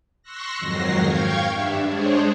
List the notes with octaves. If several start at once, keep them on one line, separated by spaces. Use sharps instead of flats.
C6 C#6 E6 F#6 A#6
F2 G#2 D#3 F#3 A#6 C7
F5 G5 C#6 G#6
G2 G3 D4 E5
G#3 D4 G#4 C5 C#5